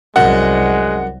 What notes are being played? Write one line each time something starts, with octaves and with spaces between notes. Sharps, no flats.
C2 F#2 G#3 F#5